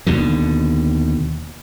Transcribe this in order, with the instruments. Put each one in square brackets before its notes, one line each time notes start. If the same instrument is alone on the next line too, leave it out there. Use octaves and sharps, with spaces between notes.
[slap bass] D#2 B2 D3